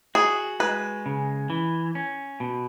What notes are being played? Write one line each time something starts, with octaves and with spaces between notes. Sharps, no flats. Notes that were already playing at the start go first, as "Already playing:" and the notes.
F#4 G#4
G#3 B4
C#3
E3
C#4
B2